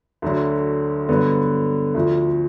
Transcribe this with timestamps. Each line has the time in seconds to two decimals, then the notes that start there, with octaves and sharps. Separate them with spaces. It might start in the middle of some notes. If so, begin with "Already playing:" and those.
0.22 D2 D3 F#3
1.09 G2 D3 F#3 B3
1.95 D2 D3 F3